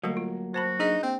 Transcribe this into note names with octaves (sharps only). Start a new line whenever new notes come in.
D3 F#3 G3 A3 A#3
F4
F#4 C5 A5 B5
D4 D#4 G#4 D#5
A#3 C4